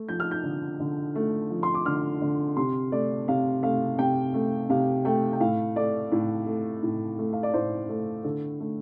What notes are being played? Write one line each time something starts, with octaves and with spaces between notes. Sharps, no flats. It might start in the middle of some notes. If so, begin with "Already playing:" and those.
Already playing: A3
F3 G6
F6
G6
D3
D3
A3
F3
C6
D6
D3 F6
D3
C3 C6
A3 D5
C3 F5
A3 F5
C3 G5
A3
C3 F5
A3 G5
G5
A2 F5
A3 D5
A2
A3
A2
A3
F5
D5
A2 C5
A3
D3 A4
A3